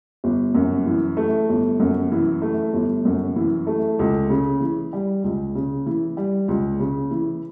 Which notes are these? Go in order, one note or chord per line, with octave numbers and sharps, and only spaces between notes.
G1
F#2
E3
A3
G1
F#2
E3
A3
G1
F#2
E3
A3
C#2
C#3
E3
G3
C#2
C#3
E3
G3
C#2
C#3
E3